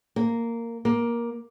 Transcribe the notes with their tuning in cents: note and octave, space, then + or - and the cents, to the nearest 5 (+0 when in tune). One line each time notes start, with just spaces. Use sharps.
A#3 -10
A#3 +15